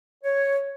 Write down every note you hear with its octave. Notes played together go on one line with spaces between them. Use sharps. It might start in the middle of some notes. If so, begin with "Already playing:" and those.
C#5